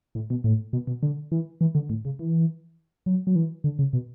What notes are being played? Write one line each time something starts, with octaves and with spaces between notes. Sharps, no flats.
A2
B2
A2
B2
B2
D3
E3
E3
D3
A2
C#3
E3
F#3
F#3
E3
D3
C#3
B2